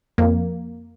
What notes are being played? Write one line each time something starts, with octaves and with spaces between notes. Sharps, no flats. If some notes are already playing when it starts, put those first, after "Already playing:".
F2 A#3